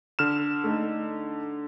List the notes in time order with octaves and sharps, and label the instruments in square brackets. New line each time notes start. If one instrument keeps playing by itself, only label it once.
[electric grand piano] D3 F6 E7
[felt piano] A3 D#4